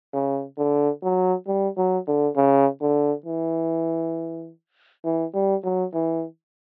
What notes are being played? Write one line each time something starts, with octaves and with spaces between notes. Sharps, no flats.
C#3
D3
F#3
G3
F#3
D3
C#3
D3
E3
E3
G3
F#3
E3